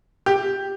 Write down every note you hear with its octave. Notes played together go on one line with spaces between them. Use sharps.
G4